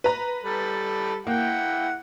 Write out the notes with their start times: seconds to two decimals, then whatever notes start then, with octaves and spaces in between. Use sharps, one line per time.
0.04 B4 A#5
0.42 G3 A4 B5
1.27 A#3 E4 F#5 G5